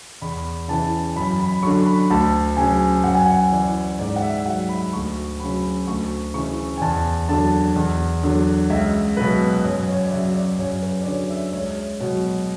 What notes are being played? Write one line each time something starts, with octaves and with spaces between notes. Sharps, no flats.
E2 B5
C#3 E3 A5
F#2 B5
B5
D3 F#3 C#6
B5
D2 A5
C#3 F#3 G#5
F#2 F#5
G#5
F#5
E3 D5
G#2 D5
F#5
E5
F#3 F#5
B5
D2 C#6
C#3 F#3 B5
D2 C#6
C#3 E3 C#6
G#5
E2 A5
D3 F#3 A5
E2
D3 F#3
C#2 E5
B2 F#3 B4
F#2 C#5
C#5
D5
C#3 F#3 E5
D5
F#2 C#5
B4
D5
D3 F#3 C#5
E5
C#2 C#5
B2 F#3 C#5